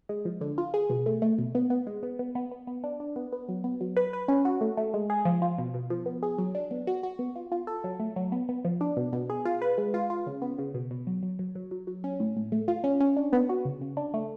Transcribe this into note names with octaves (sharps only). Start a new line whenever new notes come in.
G#3
F3
D3
F4
G#4
B2
A3
A3
B2
B3
B3
G#3
B3
B3
B3
B3
B3
D4
D4
B3
B3
F#3
B3
F#3
B4
B4
C#4
F#4
A3
A3
G#3
G#4
F3
F4
B2
B2
F3
B3
G#4
F#3
D4
B3
F#4
F#4
B3
F4
F4
A4
F#3
A3
F#3
B3
B3
F3
D4
B2
B2
G#4
F4
B4
G#3
F4
F4
C#3
B3
C#3
B2
B2
F#3
F#3
F#3
F#3
F#3
F#3
C#4
A2
A2
A3
F4
C#4
C#4
D4
B3
F#4
C#3
C#3
D4
A3